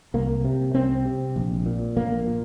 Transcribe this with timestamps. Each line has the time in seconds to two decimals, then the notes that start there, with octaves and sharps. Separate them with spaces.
0.14 C2 A#3
0.44 C3
0.74 C2 C4
1.05 C3
1.36 A#1
1.66 A#2
1.97 A#1 A#3
2.27 A#2